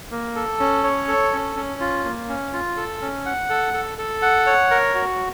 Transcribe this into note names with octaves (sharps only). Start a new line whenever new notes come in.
A#3
A4
C#4
C#5
A4
C#4
C#4
F4
A#3
C#4
F4
A4
C#4
F#5
A4
A4
A4
F#5
C#5
A#4
F#4